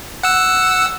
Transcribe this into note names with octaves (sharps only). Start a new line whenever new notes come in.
F#5 E6